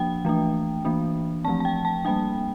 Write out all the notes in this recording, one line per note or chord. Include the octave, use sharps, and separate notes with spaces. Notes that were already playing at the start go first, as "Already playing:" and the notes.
Already playing: F3 A#3 D4 G5
E3 A3 D4
E3 A#3 D4
F3 A3 C4 A5
A5
G5
A5
G3 A#3 D4 G5